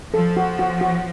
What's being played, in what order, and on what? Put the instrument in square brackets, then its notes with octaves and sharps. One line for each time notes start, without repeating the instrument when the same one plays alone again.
[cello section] F3 [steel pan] A4
[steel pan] F#4
F#4
F#4